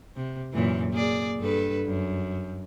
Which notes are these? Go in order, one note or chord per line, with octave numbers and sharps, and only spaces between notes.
C3
F#2 A#2 E3
A#3 G#4 D5
G2 A4 B4
F#2